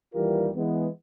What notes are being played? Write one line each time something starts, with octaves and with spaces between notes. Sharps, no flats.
D#2 E3 G3 F4 G4 A#4
E3 G#3 B3